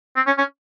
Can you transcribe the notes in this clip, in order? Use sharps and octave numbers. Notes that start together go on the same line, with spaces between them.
C4
C#4
C#4